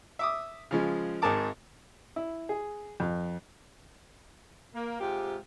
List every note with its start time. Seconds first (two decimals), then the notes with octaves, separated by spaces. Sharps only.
0.19 E5 D6 D#6
0.71 C#3 F3 G#3
1.22 G#1 G#2 G#4 A#4 A5 D6
2.16 E4
2.49 G#4
3.00 F2
4.74 A#3
5.00 G#2 C3 F4 G4